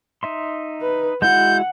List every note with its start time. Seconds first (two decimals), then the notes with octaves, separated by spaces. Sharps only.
0.23 D#4 E5 C6
0.81 B4
1.22 G#3 E4 F#4 F#5 G6